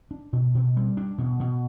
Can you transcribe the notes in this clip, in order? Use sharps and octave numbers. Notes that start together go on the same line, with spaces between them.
D4
B2
B2
G3
D4
B2
B2